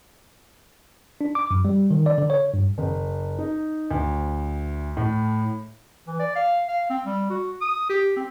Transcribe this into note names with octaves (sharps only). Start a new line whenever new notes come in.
D4
D6
F#2
G3
D#3
D5
D3
C#5
G2
F#1
D#4
D2
A2
E3
D5
F5
F5
C4
G3
F#4
D#6
G4
C4